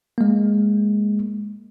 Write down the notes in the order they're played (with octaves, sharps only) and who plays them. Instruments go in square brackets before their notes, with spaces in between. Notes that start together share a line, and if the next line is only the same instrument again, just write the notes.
[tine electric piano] G#3 A#3